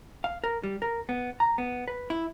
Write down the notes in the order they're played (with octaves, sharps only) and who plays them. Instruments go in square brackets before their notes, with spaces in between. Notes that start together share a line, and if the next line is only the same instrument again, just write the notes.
[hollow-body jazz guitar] F5
A#4
G3
A#4
B3
A#5
B3
B4
E4